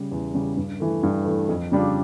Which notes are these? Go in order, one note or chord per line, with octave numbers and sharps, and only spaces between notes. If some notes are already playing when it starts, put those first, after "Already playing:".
Already playing: C#3 G3
E2
C#3 G3
G2
E3 A3
G2
E3 A3
F2
C#3 G3 D4 F4